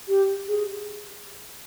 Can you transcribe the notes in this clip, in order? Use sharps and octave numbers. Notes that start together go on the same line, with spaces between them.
G4
G#4